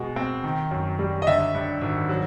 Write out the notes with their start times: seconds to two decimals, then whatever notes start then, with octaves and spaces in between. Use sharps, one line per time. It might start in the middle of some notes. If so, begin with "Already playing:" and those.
Already playing: B2 G#3
0.16 C4
0.44 D#3
0.71 F#2
0.99 G3
1.22 D#5
1.27 D3 E5
1.54 G2
1.81 G#1
2.09 F#3